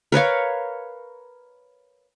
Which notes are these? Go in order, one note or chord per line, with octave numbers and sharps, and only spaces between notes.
A#4 B4 C#5 F5